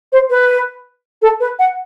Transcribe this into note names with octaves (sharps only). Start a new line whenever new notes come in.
C5
B4
A4
B4
F#5